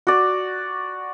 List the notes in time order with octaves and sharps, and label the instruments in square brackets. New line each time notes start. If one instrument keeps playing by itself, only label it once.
[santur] F#4 D5